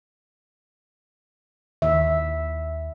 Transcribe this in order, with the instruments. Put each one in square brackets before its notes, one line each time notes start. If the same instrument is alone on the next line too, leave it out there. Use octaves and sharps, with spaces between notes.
[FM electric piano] D#2 [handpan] E5